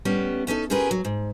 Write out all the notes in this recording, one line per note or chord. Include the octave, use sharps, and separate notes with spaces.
A2 G3 B3 C#4
B3 C#4 D#4 A4
C#4 F4 G4 G#4 A#4 B4
F#3
G#2